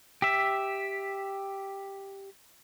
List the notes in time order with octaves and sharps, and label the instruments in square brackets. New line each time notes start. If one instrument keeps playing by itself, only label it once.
[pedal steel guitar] G4 E5